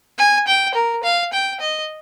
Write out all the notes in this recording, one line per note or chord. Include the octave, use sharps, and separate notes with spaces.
G#5
G5
A#4
F5
G5
D#5